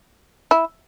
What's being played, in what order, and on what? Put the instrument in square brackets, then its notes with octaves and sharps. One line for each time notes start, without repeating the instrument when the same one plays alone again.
[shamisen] E4